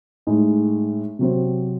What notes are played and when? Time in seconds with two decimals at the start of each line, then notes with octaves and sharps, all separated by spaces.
0.27 A2 G#3 D#4
1.19 C3 F#3 C4